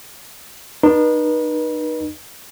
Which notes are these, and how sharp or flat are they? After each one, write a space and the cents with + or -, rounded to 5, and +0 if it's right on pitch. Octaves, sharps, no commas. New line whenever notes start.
D#4 -30 B4 -35